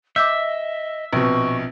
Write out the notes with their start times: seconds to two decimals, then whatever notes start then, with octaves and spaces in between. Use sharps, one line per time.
0.16 D#5 E5 D6 E6 G6
1.13 A#1 B2 C4 C#6